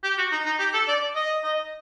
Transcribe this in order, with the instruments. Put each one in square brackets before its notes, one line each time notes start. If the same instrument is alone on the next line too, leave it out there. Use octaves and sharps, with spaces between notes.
[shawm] G4
F#4
D#4
D#4
G4
A4
D5
D#5
D#5